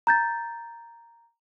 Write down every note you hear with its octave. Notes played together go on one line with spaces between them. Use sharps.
A#5 G6 A6